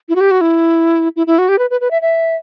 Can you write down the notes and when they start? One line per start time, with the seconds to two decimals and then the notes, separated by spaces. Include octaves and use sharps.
0.09 E4
0.15 F#4
0.20 G4
0.31 F#4
0.41 E4
1.16 E4
1.27 E4
1.38 F#4
1.49 G4
1.59 B4
1.70 B4
1.81 B4
1.91 E5
2.02 E5